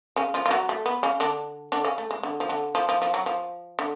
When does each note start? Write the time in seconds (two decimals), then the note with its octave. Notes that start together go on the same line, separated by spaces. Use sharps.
0.16 C#3 C#4
0.34 F3 F4
0.46 F4
0.51 F#3 F#4
0.69 A3
0.86 B3
1.03 C#3 C#4
1.20 D3 D4
1.72 D3 D4
1.84 C#3 C#4
1.98 A3
2.11 G#3
2.23 D3
2.40 F3
2.49 D3
2.75 F3
2.89 F3
3.02 F3
3.14 F#3
3.26 F3
3.79 D3